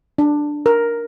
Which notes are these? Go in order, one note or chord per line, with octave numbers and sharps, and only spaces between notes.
D4
A#4